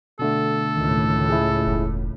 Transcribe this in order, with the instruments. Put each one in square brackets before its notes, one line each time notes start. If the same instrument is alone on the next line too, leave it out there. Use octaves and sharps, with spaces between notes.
[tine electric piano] B2 D3 A3 [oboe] A4
[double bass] C#2 A2 [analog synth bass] D#3
[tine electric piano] E4 G#4
[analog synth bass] E1